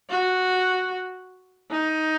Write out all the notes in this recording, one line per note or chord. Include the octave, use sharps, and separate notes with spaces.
F#4
D#4